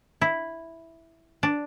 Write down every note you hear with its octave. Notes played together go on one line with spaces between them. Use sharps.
E4
D4